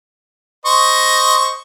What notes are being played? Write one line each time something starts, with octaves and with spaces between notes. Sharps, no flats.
C5 D#5 C#6